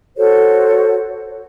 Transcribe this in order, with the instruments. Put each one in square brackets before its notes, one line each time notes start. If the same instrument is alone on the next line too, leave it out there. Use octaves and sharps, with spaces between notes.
[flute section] F#4 A4 C5 C#5